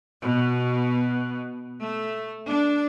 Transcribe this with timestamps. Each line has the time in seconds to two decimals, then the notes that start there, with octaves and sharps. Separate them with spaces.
0.21 B2
1.82 A3
2.48 D4